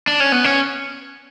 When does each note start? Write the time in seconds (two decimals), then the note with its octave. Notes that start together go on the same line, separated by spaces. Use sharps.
0.07 D4
0.20 C#4
0.32 B3
0.44 C#4